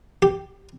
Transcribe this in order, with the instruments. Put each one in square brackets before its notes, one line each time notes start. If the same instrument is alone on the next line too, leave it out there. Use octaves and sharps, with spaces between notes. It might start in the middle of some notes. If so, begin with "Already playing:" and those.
[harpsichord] G4